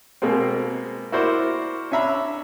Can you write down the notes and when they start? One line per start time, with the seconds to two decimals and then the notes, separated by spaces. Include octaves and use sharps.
0.22 B2 G#3 A#3 C4
1.12 E4 F#4 A#4 C5 D5
1.92 C#4 D4 E5 A#5 B5